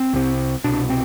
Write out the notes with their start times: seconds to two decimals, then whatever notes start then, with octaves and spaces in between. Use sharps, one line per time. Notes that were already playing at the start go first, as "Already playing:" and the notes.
Already playing: C4
0.13 C2 C3
0.64 C2 B2 D4
0.90 C4